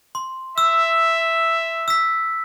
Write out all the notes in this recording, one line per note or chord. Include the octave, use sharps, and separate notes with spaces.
C6
E5 E6
E6 B6